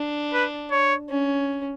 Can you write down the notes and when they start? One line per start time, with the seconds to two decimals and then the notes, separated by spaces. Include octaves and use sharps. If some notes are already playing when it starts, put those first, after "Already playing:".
Already playing: D4
0.33 B4
0.71 C#5
1.09 C#4